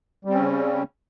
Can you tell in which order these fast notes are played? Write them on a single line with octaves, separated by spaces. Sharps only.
G3 C4 C#4 C#3